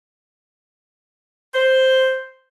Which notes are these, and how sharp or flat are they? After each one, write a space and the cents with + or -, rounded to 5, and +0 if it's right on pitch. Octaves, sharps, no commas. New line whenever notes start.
C5 +0